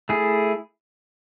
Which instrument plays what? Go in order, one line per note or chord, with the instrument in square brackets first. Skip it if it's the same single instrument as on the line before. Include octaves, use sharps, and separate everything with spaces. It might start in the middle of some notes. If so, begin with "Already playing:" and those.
[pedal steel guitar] A3 E4 G#4